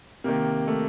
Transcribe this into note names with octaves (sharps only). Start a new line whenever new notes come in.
C3 D#3 A#3
A3